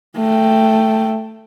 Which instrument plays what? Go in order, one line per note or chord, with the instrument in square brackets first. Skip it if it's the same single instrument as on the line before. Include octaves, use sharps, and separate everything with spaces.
[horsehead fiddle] A3 G5